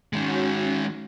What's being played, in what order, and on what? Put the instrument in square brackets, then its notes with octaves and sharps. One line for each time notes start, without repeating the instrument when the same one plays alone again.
[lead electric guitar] D#3 G#3 [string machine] C#4 F#4